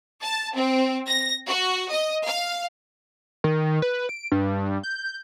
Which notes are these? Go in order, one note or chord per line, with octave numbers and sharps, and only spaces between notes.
A5
C4
A#6
F#4
D#5
F5
D#3
B4
D7
G2
G6